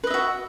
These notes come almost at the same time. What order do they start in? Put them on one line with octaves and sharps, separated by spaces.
B4 D#5 E5 F#4